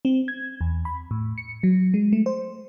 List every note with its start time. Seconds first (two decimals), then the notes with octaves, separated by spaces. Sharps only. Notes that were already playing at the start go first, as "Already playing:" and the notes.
0.05 C4
0.28 G#6
0.61 E2
0.85 B5
1.11 A2
1.38 C#7
1.63 F#3
1.94 G#3
2.13 A3
2.26 C5